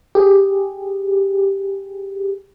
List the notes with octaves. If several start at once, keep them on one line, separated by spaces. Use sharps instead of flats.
G4 G#4